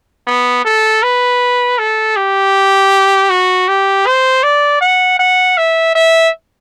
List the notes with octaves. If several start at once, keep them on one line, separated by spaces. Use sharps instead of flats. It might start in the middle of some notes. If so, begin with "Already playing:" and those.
B3
A4
B4
A4
G4
F#4
G4
C5
D5
F#5
F#5
E5
E5